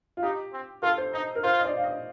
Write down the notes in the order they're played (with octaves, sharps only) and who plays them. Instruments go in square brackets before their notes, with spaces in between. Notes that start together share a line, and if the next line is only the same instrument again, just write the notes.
[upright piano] F4
[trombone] D#4 [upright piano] G4
[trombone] C4
[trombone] F4 [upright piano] A4
[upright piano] C5
[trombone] D#4 [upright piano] D#5
[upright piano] A#4
[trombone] F4 [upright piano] C5
[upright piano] D#5
D5
F5
D#5